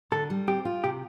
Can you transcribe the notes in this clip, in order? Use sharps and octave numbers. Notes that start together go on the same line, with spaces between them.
D3 A4
G3
C4 G4
F4
C3 G4